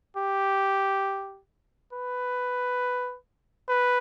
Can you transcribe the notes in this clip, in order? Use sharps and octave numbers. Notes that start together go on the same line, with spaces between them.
G4
B4
B4